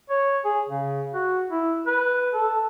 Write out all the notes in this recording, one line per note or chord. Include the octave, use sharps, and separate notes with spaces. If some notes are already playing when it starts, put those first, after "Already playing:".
C#5
G#4
C#3
F#4
E4
B4
A4